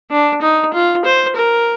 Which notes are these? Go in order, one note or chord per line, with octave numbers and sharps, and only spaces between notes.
D4
D#4
F4
C5
A#4